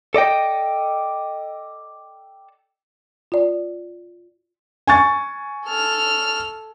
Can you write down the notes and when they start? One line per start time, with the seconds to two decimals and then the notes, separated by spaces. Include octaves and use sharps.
0.14 A4 D5 D#5 G5
3.32 F4 D5
4.87 G#5 C#6 A6
5.66 A4 F6